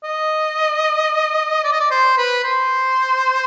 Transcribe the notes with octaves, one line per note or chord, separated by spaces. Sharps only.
D#5
D5
D#5
D5
C5
B4
C5